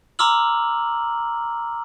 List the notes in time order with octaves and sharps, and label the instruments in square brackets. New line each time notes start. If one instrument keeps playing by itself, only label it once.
[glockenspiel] A#5 C6 D6 E6 F6 F#7